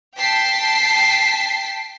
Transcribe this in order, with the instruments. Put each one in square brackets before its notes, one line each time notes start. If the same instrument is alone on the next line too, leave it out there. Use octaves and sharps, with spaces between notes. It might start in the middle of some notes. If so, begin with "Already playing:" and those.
[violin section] G5 A5 B6 C7